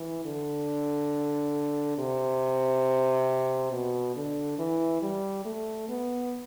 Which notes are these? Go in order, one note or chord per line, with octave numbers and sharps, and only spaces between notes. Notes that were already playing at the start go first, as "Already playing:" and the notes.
Already playing: E3
D3
C3
B2
D3
E3
G3
A3
B3